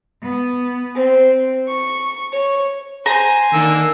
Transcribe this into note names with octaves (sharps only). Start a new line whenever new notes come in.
B3
C4
C#6
C#5
C5 G#5 A#5
D3 D#3 A#3 E6